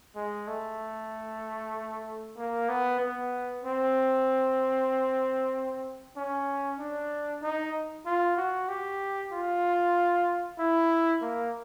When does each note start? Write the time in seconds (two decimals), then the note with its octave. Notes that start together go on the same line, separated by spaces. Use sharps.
0.16 G#3
0.47 A3
2.37 A#3
2.69 B3
3.00 B3
3.64 C4
6.16 C#4
6.79 D4
7.42 D#4
8.06 F4
8.37 F#4
8.69 G4
9.33 F4
10.59 E4
11.22 A#3